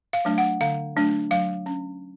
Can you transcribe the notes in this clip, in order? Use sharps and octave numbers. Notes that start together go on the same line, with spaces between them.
F5
F#3 A3 D4
F#5
D3 F5
F#3 A3 D4
F#3 F5
C#4